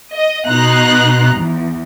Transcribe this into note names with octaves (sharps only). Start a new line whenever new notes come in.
D#5
B2 D#4 A#5 C6 F#6
E2